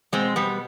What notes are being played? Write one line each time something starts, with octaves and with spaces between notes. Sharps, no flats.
B2 G#3 C4
G3 B3